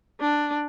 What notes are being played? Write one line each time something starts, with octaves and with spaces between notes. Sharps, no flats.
D4